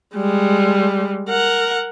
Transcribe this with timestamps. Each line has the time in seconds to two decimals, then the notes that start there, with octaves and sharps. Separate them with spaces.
0.15 G3 G#3
1.29 A#4 F#5